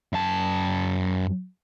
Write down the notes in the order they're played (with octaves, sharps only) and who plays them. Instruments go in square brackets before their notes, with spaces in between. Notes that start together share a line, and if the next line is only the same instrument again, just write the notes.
[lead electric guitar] F#2 A5